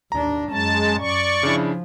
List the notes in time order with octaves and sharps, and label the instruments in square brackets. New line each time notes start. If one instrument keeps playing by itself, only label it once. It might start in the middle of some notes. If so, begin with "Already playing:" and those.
[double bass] D#2 D4 [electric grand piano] A#5
[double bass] F#2 C#4 [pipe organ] G#3 A5
[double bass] F#2 [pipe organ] D5 C#6
[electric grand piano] C#3 D4 E4 [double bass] F3